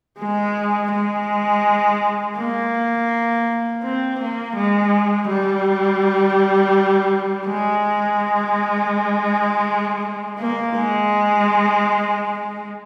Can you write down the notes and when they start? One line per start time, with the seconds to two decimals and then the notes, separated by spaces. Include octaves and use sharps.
0.19 G#3
0.92 G#3
2.37 A#3
3.83 C4
4.20 A#3
4.56 G#3
5.28 G3
7.47 G#3
10.39 A#3
10.75 G#3